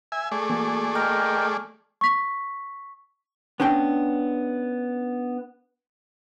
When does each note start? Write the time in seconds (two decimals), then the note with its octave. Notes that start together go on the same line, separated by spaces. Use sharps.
0.12 E5 G#5
0.32 A3 G#4 D5
0.50 E3 A#3 F#4
0.95 A#4 D#5 G5 F6
2.01 C#6 B6
3.60 B3 C#4 D4 G5